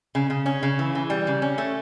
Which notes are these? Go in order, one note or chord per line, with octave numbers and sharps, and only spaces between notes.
C#3
C#3
C#4
C#3
E3
E3
G3
C#3
C#4
A3